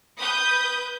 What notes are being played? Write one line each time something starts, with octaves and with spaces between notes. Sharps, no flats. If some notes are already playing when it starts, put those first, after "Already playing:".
B4 D#6 G6